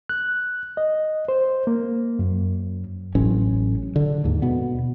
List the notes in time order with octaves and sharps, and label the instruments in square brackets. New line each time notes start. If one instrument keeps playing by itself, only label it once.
[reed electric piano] F#6
D#5
C5
A#3
F#2
[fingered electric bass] A1 A2 F#3 C#4
D3
D#2 G#2
B2 B3